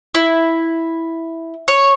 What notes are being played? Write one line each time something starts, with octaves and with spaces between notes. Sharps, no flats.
E4
C#5